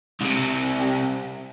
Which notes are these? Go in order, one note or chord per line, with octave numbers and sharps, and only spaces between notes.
C2 C3